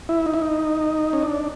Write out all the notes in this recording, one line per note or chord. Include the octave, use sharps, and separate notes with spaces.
E4
D#4
E4
D#4
C#4
D4